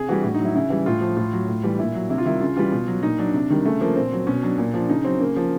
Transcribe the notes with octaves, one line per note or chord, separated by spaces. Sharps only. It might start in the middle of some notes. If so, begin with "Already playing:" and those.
Already playing: C3 G#4
E3 G3 F#4
A2 F#4
D#4
F#3 E4
C#3 E4
E3 G3
A2 F4
F3
A2 F4
F#3
A2
E3 G3
A#2 E4
F#3
C3 E4
F4
D#3 G3 E4
C#3 F4
E3 G3 F4
B2
F#3
A#2 D#4
F#3 D4
C3
D#3 G3
C#3 A3
F3 A#3
A#2 C4
F#3
B2 C#4
F#3 D4
A#2 D4
F3 D4
C#3 D#4
F#3 C4
C#3 A#3
F3